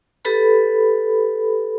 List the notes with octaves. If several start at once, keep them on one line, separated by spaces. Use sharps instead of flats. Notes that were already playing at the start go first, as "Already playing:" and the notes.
G4 A4 B4 B5